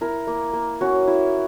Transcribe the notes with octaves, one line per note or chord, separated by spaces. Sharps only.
E4 A#4
A#3
A#3
C#4 F#4
E4